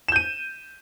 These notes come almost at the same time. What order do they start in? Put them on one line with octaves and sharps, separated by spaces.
E7 G6 D#7